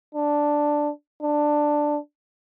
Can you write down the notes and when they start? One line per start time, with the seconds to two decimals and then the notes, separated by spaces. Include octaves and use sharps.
0.15 D4
1.22 D4